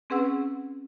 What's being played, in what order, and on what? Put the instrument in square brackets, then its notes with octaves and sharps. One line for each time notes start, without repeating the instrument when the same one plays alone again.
[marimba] C4 C#4 G#4 B4 F#5 E6